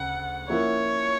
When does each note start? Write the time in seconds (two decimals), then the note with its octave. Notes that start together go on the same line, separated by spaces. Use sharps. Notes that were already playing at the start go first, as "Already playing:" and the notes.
Already playing: D2 C#3 F#5
0.49 F3 A#3 C#4 E4 C#5